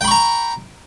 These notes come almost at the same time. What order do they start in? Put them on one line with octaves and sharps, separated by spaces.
G5 B5 C#6 A#5